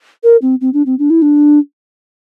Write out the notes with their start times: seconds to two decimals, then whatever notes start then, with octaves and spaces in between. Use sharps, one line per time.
0.23 A#4
0.42 C4
0.61 C4
0.74 D4
0.86 C4
0.99 D4
1.10 E4
1.22 D4